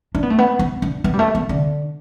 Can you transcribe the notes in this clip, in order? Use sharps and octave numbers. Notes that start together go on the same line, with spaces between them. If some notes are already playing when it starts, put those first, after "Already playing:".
D4
B3
A3
B3
B3
D4
B3
G3
A3
B3
D3